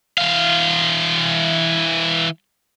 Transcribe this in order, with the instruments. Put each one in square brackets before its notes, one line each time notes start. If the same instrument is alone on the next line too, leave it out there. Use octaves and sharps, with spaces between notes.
[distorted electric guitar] E3 F5